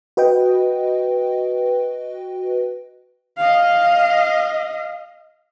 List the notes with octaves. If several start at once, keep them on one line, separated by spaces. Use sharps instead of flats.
F#4 B4 D#5 G5
D#5 F5